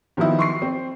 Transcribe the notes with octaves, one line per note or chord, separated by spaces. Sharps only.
D#3 F3 F#3 B3 D#4 E4
C6 C#6 C7
C4